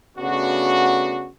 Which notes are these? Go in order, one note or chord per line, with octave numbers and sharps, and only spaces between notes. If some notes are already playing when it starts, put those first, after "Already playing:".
C#3 A3 B3 D4 F#4